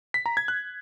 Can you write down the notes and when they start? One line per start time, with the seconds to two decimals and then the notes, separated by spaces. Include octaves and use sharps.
0.14 B6
0.26 A#5
0.37 G#6
0.48 F#6